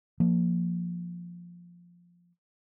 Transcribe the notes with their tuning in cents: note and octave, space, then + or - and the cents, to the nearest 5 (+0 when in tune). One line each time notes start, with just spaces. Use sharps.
F3 +0 A#3 +0